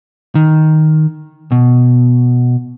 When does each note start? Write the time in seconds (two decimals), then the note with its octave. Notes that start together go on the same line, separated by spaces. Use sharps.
0.35 D#3
1.52 B2